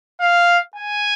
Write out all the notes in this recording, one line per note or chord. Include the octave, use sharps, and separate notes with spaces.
F5
G#5